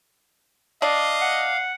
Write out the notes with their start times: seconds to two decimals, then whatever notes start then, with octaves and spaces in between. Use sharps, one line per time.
0.82 D4 D#5 F5
1.21 F#5